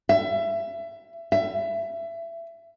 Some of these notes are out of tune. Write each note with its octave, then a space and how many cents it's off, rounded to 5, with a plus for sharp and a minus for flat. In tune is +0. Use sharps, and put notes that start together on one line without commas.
E5 +25
E5 +25